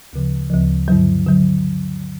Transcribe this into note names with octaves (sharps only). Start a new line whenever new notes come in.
D2 C#3 F3
D2 C#3 F3
G2 D3 F#3
D3 F#3